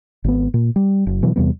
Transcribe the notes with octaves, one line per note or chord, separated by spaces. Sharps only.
G#1 B3
A#2
G3
F#1
B2 E3 F#3
E2 C3 G3 B3